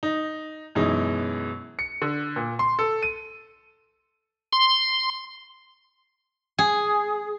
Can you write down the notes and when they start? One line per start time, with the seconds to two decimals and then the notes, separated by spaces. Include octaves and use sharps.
0.03 D#4
0.75 F#2 B2 E3 G#3 D#4
1.79 C#7
2.02 D3
2.36 A#2
2.59 C6
2.79 A4
3.03 D#7
4.53 C6
6.58 G#4